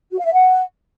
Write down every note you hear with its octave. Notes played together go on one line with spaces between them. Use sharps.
F#4
F5
E5
F#5